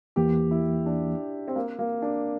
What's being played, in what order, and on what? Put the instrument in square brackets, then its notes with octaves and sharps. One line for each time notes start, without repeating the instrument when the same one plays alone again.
[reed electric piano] E2 E3 A#3 [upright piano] G4
[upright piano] E4
D4
C4
A#3
A#3
D4